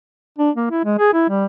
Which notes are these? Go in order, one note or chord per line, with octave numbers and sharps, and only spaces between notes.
D4
A#3
E4
G#3
G#4
E4
G3